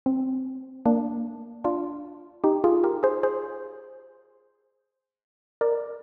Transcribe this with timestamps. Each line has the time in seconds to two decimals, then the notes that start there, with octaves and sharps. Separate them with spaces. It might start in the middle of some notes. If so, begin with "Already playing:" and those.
0.06 C4
0.86 A#3 D4
1.64 D4 F4
2.44 D#4 G4
2.64 F4 G#4
2.84 G4 A#4
3.03 G#4 C5
3.23 G#4 C5
5.61 A#4 D5